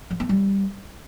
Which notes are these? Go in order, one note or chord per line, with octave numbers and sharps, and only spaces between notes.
F3
B3
G3